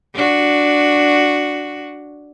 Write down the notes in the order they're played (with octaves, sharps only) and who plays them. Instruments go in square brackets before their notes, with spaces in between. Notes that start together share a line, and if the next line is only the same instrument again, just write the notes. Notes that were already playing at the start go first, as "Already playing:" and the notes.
[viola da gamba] D4 F#4